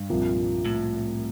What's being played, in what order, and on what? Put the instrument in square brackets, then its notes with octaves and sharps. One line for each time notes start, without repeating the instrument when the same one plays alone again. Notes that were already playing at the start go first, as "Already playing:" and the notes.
Already playing: [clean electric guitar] G2
[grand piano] C2 A#2 F3
[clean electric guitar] A2